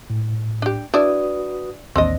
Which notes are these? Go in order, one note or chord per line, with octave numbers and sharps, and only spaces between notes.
A2
D4 G4
D4 E4 F#4 B4 D5 D#6
A1 D#2 C4 D4 D#5